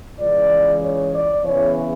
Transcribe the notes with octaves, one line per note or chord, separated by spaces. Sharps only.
C#2 C#3 E3 D5
C#5
D5
E2 C#3 E3 C#5